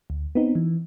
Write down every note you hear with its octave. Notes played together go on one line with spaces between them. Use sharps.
D2
B3 C4 D#4
E3